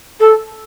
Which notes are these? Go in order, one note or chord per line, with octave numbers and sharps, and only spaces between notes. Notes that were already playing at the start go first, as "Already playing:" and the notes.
A4